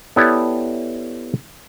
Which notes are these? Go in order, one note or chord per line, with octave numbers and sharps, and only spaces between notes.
B3 E4 G4 A4 C#5 D5